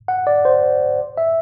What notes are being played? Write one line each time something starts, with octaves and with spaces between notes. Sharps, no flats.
F#5
D5
C5
E5